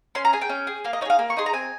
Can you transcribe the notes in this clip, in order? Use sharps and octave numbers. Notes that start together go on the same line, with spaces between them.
C#4 C6
A#5
G#4 G#5
G5
C#4
G#4
A#3 F5
D#5
D#4 G#4 C#5 F5
A#3
C#6
D#4 G#4 C6
A#5
C4 G#5